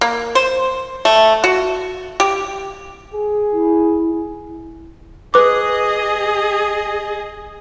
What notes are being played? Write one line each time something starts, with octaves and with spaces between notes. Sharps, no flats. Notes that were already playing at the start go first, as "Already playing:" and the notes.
A#3
C5
A3
F#4
G4
G#4
E4
G#4 B4 D#5 D6